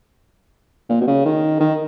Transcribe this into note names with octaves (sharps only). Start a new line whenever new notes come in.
A#2
B2
C#3
D#3
D#3